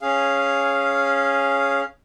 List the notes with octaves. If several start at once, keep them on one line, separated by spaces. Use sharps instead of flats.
C#4 G#4 F5